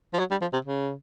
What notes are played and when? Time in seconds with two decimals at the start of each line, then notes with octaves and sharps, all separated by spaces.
0.13 F3
0.19 F#3
0.31 G3
0.41 F3
0.53 C3
0.65 C#3